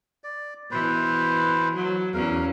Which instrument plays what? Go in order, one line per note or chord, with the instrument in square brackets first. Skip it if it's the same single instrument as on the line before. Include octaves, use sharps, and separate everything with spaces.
[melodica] D5
[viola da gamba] B2 E3 [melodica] B4 C5
[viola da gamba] F#3
[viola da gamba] E2 C#4 [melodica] A#4 F5